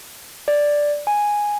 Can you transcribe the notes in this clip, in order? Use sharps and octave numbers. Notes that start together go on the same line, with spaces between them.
D5
G#5